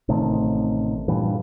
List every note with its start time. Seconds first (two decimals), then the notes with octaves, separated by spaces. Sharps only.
0.09 A1 C3 D#3 A3
1.08 G2 A#2 E3